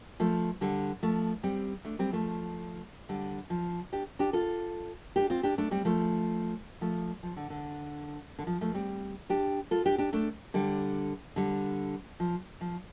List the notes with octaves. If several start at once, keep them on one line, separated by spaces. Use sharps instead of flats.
F3 A3
D3 G3
F3 A3
G3 C4
A3 D4
G3 C4
F3 A3
D3 G3
F3
D4 G4
D4 G4
F4 A4
D4 G4
C4 F4
D4 G4
A3 D4
G3 C4
F3 A3
F3 A3
F3
D3
D3
D3
F3
F3 A3
G3 C4
D4 G4
F4 A4
D4 G4
D4 G4
A3 D4
D3 G3
D3 G3
F3
F3